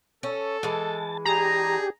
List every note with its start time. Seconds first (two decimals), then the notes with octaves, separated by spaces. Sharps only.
0.23 C#4 A4
0.63 E3 G#3 A5
1.25 D4 G4 G#4 A#5